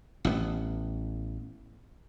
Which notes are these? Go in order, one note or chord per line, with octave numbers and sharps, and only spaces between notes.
A1 B3